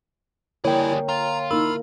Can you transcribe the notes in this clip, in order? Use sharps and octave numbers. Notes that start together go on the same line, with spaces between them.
D3 G3 A#3 E4 G#4 A#4 C#5 G5
F4 A#5
A#3 D#4 E4 A#4 B5 E6